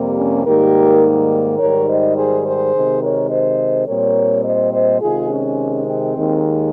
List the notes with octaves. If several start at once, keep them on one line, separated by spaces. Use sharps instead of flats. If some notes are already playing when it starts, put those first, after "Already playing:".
Already playing: F2 C3 G3 A#3
C#4
G#2 D#3 G3 A#3 G4 A#4
G#2 D#3 G3 A#4 C#5
C5 D#5
G#4 C5
G#4 C5
C3 D#3 G#3
A#4 C#5
C5 D#5
A#2 G3 C4 A#4 C#5
C5 D#5
C5 D#5
C3 D#3 G#3 F4 G#4
C#4
C4
D#2 D#3 G#3